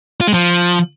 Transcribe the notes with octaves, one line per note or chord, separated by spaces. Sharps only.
F4
G#3
F3